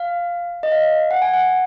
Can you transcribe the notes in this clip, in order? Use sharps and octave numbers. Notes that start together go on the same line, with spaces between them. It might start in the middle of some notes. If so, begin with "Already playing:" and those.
Already playing: F5
D#5
F5
F#5
G#5
F#5